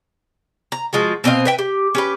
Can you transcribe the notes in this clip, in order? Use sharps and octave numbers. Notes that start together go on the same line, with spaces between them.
A#5
F3 G#3 F4 F#4
B2 C4 D#5 F5
B4 E5 G5
G4
C#4 G4 B4